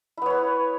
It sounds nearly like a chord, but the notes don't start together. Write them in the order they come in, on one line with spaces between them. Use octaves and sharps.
E4 B3 C#5 B4